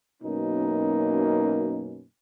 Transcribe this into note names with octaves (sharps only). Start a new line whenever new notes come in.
F#2 B2 A#3 C#4 D#4